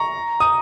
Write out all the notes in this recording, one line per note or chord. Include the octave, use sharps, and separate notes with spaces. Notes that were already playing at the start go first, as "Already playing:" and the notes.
Already playing: A#5 C#6
D#6